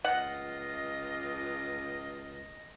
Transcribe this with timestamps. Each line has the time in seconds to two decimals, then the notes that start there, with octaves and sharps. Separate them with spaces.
0.05 C#2 F4 D#5 F#5